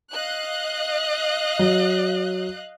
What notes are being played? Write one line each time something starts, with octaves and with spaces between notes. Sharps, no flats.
D#5 F5 F#6
F#3